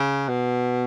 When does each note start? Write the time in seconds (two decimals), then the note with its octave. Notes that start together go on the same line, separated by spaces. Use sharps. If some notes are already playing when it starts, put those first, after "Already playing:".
Already playing: C#3
0.29 B2